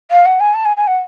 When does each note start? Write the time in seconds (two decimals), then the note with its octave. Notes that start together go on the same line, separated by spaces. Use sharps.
0.10 F5
0.25 F#5
0.40 G#5
0.54 A5
0.65 G#5
0.76 G#5
0.87 F#5